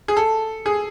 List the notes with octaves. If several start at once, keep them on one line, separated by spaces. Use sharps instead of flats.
G#4
A4
G#4